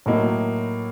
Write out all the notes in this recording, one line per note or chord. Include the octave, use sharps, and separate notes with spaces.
A2 F#3 A#3 D#4